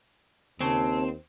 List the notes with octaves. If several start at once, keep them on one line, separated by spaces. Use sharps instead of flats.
D#2 C#3 C4 A5